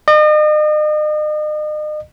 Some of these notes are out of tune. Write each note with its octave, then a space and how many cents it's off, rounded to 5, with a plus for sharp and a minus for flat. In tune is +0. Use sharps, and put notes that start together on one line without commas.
D#5 -40